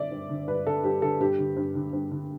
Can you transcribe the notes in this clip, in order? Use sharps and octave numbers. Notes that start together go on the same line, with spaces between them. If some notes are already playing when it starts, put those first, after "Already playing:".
Already playing: D3 D5 E5
G2
D3
G2 B4
D3 A4
G2 G4
D3 A4
G2 G4
D3
G2
D3
G2
D3